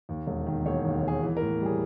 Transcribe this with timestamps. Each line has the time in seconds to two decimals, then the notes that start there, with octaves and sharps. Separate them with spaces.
0.09 D#2
0.27 E1
0.47 D#3
0.66 E1 C#5
0.85 D#2
1.03 E1 G#4
1.23 E3
1.37 A#4
1.41 A2
1.61 G3
1.66 G#4